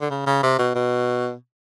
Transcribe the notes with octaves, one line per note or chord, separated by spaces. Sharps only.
D3
C#3
C#3
C3
B2
B2